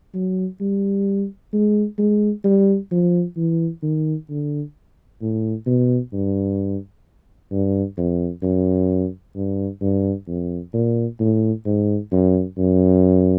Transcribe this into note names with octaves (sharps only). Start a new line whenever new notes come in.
F#3
G3
G#3
G#3
G3
F3
E3
D#3
D3
A2
B2
G2
G2
F2
F#2
G2
G2
F2
A#2
A2
G#2
F#2
F#2